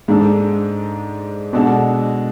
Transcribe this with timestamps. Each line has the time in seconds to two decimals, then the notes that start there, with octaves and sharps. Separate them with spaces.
0.08 G#2 G#3 D4 A4
1.53 B2 G#3 D4 F#4 A4